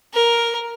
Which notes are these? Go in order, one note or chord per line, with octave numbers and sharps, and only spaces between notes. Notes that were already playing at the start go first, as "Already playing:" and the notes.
A#4